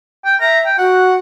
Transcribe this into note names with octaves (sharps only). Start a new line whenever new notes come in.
G5
E5 A#5
G5
F#4 F#5